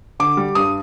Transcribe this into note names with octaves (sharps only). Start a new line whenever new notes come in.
D3 D6
G3
G2 D#6